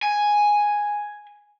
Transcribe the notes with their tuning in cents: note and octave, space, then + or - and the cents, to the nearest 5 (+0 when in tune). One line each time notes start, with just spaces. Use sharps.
G#5 +0